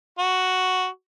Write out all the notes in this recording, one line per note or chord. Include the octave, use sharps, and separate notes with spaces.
F#4